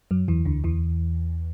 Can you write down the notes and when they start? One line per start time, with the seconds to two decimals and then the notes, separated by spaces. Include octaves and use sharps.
0.11 F#2 F#3
0.28 E2 E3
0.45 D2 D3
0.64 E2 E3